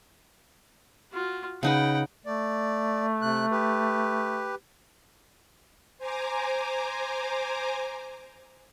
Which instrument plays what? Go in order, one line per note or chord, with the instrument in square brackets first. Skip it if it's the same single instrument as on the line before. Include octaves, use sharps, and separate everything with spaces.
[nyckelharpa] F4 F#4
[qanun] C#3 D#4 B4 [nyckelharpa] F#5 G5
[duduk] A3 [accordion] D5
[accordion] C3 F#6
G4 B4
[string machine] C5 G#5 A#5 D6